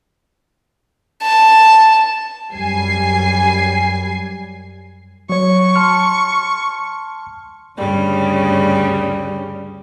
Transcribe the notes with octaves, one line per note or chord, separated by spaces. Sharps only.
A5
F#2 G3 G#5 C7
F#3 C#5 C#6
A5 C6 F6
D2 G2 C#3 G3